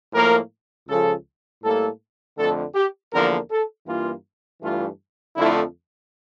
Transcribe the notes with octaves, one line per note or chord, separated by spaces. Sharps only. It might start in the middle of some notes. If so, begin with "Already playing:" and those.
A2 F3 A#3 A#4
C#2 C#3 F3 A4
A2 G3 A#3 A4
F2 D3 A3 A4
G4
E2 D3 F3 A#3 A#4
A4
G2 E3 A#3 F4
G2 E3 A3 F4
F2 D3 F3 A3 E4